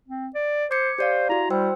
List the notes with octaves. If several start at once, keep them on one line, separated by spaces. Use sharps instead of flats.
C4
D5
C5 D6 G#6 C#7
G4 C5 D5 F5
E4 F#4 A#5
G3 C5 G5 E6